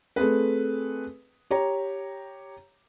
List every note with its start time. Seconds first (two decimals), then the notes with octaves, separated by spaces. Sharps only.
0.16 A3 C4 G#4 B4
1.51 G4 C#5 A#5